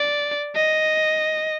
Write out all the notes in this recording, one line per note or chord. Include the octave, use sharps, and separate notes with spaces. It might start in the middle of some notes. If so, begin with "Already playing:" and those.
Already playing: D5
D#5